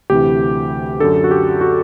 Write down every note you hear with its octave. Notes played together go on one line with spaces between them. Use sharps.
D2 C3 E3 G4
F#2 D3 A4
F#4
G4
F#4